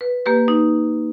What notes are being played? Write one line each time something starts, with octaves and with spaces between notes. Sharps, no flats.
B4
A#3 G4 B4
D#4